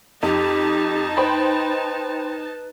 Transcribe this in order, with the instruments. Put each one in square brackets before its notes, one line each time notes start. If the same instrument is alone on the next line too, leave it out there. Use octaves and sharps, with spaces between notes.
[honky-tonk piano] F2 [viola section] D#4 A5 [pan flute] G4
[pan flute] B4 [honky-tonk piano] C5 G5 B5